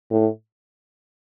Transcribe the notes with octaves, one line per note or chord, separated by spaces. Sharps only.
A2